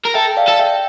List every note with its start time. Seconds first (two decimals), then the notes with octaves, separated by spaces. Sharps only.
0.05 A#4
0.14 A4 E5 G5
0.37 D5 F5
0.48 A4
0.59 E5 G5